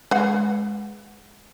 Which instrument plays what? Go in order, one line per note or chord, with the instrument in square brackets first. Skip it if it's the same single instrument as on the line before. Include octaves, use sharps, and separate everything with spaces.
[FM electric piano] G#3 [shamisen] B4 F5 F#5